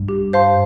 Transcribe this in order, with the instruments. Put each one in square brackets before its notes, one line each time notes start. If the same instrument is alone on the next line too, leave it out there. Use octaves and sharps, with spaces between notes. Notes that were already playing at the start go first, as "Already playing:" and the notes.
Already playing: [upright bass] G2
[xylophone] G4
C5 F5 A5 C6